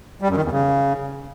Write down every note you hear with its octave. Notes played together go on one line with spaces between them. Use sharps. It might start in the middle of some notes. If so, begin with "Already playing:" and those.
G3
F#2
D#3
E2
C#3